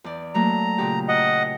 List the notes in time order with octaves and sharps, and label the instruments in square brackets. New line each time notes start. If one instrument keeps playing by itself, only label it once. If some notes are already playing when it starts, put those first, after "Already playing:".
[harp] E2 D5
[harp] F#3 A3 A#3 [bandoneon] A#5
[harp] A#2 C#3 G4
[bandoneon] D#5 F#5